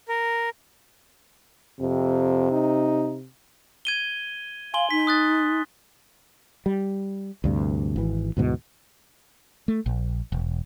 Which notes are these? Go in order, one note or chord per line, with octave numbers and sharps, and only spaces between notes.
A#4
F2 C3
D#4
G#6 D#7 G7
F5 G#5 C6 G7
D#4 B6
D#6 F#6 A6
G3
D2 G2 C3
G#1 E3
D2 G#2 B2 E3
A3
A#1
E1